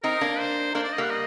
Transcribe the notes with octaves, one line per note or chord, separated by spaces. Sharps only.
C4 D#4 A#4
A#3 D4
C5
A#3 D4 C5
D5
D#5
G3 A#3 F#5
D#5